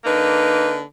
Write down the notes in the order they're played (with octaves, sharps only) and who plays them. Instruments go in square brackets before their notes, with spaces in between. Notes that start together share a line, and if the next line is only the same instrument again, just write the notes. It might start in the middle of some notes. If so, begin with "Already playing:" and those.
[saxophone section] D3 A#3 D#4 B4